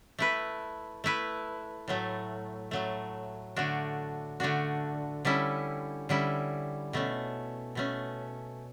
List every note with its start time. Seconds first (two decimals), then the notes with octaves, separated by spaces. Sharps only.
0.19 A3 E4 B4
1.04 A3 E4 B4
1.88 A2 F#3 A3
2.71 A2 F#3 A3
3.56 D3 A3 D4 F#4
4.40 D3 A3 D4 F#4
5.25 D3 G3 C#4 E4
6.09 D3 G3 C#4 E4
6.93 B2 A3 C#4
7.75 B2 A3 C#4